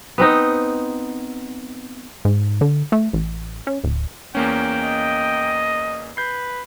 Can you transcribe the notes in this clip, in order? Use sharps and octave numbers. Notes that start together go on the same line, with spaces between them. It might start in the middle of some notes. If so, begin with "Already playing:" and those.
B3 C4 D#4
G#2
D3
A3
A1
C#4
D1
E2 A#3 C#4 G5
D#5
B4 G6 C7